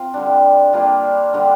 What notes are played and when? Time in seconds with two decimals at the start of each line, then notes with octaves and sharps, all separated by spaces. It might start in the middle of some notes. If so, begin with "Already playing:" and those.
Already playing: C4 F4
0.14 D3 G3 D4
0.73 G3 A#3 D4 F4
1.33 D3 G3 D4